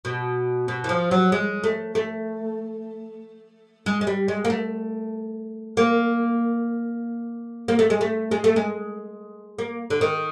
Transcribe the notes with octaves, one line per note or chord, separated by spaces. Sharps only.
B2
B2
E3
F3
F#3
G#3
A3
A3
G#3
G#3
G3
G#3
A#3
A3
A#3
A#3
A3
G#3
A3
G#3
A3
G#3
A#3
D3
D#3